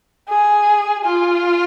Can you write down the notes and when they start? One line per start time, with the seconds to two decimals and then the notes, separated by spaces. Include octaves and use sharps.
0.29 G#4
1.04 F4